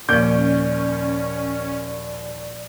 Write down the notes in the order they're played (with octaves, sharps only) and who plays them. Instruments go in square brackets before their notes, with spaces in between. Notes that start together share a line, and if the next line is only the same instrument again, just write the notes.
[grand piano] D#2 G6 [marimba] A#2 F3 [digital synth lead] C#4 [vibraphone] D5